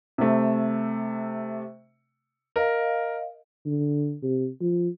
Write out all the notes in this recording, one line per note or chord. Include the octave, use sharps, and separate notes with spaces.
C3 A3
A#4 D#5 F5
D3
C3
F3